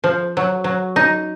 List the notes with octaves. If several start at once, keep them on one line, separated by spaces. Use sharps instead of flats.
F3
F#3
F#3
D#4